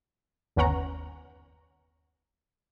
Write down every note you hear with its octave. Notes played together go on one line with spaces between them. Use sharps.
G1 D#2 B3 C#4 F#5 A#5